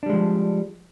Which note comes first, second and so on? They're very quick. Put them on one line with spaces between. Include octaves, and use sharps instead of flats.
D4 G3 G#3 F3